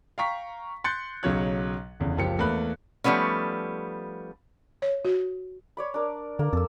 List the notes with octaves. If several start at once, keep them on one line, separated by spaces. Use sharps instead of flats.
F5 G5 A#5 C#6 B6
C6 F#6 G6 A6 C#7
B1 C#3 F#3 C#5 F#6
F1 E2 C#3
F#1 C#2 F3 G4 C#7
E2 A3 A#3 B4 B5 F#6
F3 G3 A3 B3 C#4
C#5
F#4
C#5 D5 B5
D4 A#4
D3 A#3
F2 A4 E6